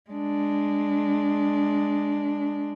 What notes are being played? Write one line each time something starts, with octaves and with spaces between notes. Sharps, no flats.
G#3 D4